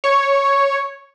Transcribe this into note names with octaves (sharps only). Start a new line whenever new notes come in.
C#5